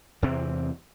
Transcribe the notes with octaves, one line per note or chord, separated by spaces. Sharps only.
E2 C3 E3 C4